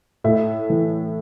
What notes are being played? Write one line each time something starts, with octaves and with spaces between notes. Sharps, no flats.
A2 E5
E3